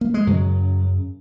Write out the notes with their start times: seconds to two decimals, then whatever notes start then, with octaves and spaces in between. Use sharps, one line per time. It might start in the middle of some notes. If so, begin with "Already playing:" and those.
0.01 A#3
0.14 G#3
0.27 F#2 C#3 F#3